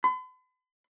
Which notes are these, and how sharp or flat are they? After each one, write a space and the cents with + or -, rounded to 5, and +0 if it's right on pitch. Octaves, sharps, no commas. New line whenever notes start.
B5 +45